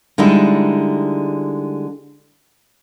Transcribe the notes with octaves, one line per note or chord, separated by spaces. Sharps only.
D3 G3 G#3 D#4 E4